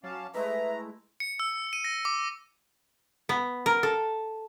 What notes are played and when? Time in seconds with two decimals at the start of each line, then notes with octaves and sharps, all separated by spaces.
0.04 F#3 C#4 F5 A5 D6
0.34 G#3 A3 E4 B4 E5 A#5
1.20 C#7
1.40 E6
1.73 D#7
1.84 A#6
2.05 D6
3.29 B3
3.66 A#4
3.83 A4